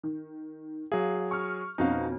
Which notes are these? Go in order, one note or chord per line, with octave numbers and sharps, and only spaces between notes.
D#3
F#3 G#4 F5
C#6 F6
F2 B2 C#4 D#4 F#4 F5